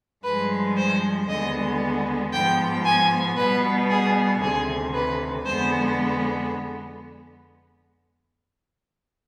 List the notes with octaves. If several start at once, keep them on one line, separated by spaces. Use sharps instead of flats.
G2 F3 G#3 B4
C5
D#2 D3 G#3 B3 D#5
G#2 F3 B3 G5
G#5
B2 G3 B3 B4
G#4
D2 C3 D#3 G#4
B4
F2 D3 G#3 B3 C5